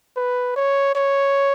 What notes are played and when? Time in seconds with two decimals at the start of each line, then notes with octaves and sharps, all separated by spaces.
0.16 B4
0.56 C#5
0.95 C#5